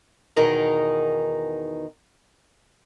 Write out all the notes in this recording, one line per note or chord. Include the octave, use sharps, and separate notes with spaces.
E2 B2 D#3 D#4 G#4 A#4